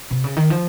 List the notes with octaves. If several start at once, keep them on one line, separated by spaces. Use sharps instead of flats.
C3
C#3
D#3
F3